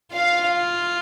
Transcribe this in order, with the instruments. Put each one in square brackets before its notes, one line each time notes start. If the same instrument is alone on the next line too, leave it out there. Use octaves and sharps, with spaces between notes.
[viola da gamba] F4 [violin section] F5